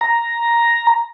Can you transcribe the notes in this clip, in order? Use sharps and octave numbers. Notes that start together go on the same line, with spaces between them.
A#5